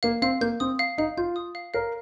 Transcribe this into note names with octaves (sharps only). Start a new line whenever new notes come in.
A#3 F5
C4 F5
A#3 G6
C4 D#6
F5
D#4 F5
F4 G6
D#6
F5
A#4 F5